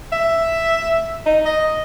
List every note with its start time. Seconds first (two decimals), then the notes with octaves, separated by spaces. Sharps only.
0.12 E5
1.26 D#4
1.45 D#5